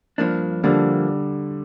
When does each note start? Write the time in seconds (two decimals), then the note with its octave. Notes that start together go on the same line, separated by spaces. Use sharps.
0.18 G2 F3 A#3 D4
0.63 D3 F3 G3 A#3 D4